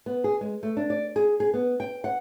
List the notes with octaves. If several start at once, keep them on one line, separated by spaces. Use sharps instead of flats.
B3
G#4
G#3
A3
D4
D5
G#4
G#4
B3
G5
F#5